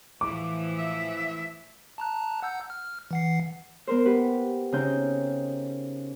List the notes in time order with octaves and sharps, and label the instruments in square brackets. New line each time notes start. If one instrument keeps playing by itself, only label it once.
[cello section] A2 E3 F3 [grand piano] D6
[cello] E5
[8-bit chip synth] A5 A#5 F#6
F#5 E6 G6
F6
E3 F#5 C7
[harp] B3 A#4 C5
G4 B4 F#5
C#3 C4 D#4 A#5 G6